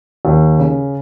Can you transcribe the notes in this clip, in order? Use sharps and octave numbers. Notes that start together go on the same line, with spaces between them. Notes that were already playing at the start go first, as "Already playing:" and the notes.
D#2
C#3